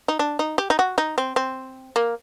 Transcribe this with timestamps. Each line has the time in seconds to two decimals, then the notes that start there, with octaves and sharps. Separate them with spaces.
0.08 D#4
0.19 D4
0.39 D#4
0.58 G4
0.70 D#4
0.79 F#4
0.98 D#4
1.18 C4
1.36 C4
1.96 A#3